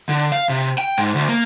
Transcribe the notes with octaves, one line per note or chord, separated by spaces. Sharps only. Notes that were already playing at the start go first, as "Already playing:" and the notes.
D3
F5
C3
G5
G#2
D2
A#3